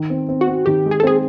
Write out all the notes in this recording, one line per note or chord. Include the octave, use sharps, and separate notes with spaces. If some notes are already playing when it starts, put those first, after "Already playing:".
Already playing: D#3
C4
C4
F#4
C4
D#3 G4
G#3
G#4
A4
C4 G#4